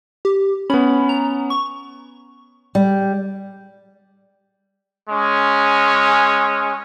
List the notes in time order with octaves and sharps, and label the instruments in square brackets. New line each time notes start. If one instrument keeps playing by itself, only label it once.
[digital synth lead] G4
[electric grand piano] B3 C#4 [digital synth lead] B5
[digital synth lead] A#5
C#6
[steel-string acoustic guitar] G3
[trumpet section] G#3 C#4